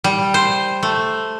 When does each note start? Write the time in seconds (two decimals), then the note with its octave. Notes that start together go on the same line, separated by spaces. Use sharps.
0.04 G3
0.34 C5
0.83 A3